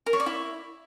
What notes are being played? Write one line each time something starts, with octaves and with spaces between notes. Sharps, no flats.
A#4
C#5
D5
E4